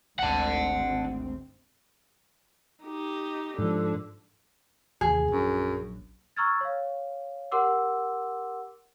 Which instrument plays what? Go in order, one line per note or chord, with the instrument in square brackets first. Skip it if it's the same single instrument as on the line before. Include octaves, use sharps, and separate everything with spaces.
[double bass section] G#1 D2 C4 [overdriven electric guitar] F#5 A5
[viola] D#4 G4
[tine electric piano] G#2 F3 [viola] D3
[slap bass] A1 D#2 C3 [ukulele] G#4
[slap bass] A#1 F#3 D4 [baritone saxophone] F#2
[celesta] A#5 C#6 E6 F6 G#6 A6
C#5 F5
G4 A#4 F#5 C6 D6 E6